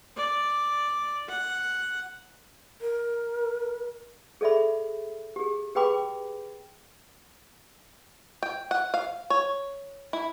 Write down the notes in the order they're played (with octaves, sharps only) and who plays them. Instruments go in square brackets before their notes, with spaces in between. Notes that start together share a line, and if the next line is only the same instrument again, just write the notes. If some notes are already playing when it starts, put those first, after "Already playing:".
[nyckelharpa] D5
F#5
[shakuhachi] A#4
[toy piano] G#4 A4 D5 E5 B5
G4 G#4
G4 G#4 B4 G5 B5 D6
[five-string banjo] G5
F#5
F5
C#5
E4